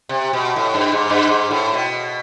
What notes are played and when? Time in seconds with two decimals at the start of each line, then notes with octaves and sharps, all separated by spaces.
0.09 C3
0.33 B2
0.56 A2
0.74 G2
0.92 G#2
1.10 G2
1.28 G#2
1.51 A2
1.74 B2